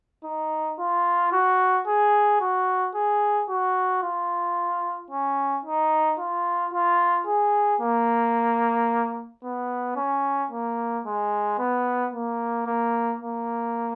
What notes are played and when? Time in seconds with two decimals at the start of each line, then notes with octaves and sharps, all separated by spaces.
0.24 D#4
0.79 F4
1.32 F#4
1.87 G#4
2.40 F#4
2.95 G#4
3.49 F#4
4.03 F4
5.10 C#4
5.65 D#4
6.19 F4
6.73 F4
7.27 G#4
7.81 A#3
9.43 B3
9.96 C#4
10.51 A#3
11.06 G#3
11.58 B3
12.13 A#3
12.67 A#3
13.21 A#3